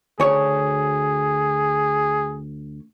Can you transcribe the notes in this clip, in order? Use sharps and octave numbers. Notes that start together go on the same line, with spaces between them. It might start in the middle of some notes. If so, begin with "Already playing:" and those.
D2 G#4 C#5